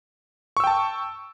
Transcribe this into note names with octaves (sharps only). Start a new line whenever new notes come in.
G5 A5 C#6 E6